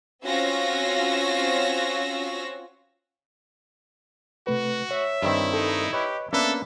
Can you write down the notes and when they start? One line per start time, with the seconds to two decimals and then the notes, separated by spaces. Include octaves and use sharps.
0.24 C4 C#4 F4 F#4 E6 A#6
4.47 C3 A3 F#4 B4
4.91 C#5 E5
5.22 G2 D#3 C4 E4
5.54 D#4 A4
5.93 G4 B4 C#5 D#5
6.33 A#3 B3 C#4 D4 A4 B4 E5